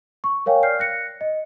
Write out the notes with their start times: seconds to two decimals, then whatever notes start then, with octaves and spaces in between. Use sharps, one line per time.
0.24 C#6
0.46 A#4 C#5 F5 G5 G#5
0.63 D5 F6 G6 C7
0.79 F#6 A#6 C#7
1.21 D#5